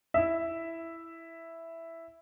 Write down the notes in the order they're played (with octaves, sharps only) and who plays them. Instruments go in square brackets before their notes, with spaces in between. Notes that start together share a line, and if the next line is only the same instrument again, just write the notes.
[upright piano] E4 E5